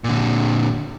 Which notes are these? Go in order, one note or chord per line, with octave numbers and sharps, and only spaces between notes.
A#2 D3